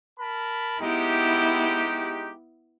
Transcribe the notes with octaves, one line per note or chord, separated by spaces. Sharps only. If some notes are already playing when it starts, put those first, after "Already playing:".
A#4 A5 B5
G#3 B3 D#4 E4 G4